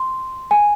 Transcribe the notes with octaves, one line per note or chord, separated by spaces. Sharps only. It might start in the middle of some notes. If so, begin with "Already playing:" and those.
Already playing: C6
G#5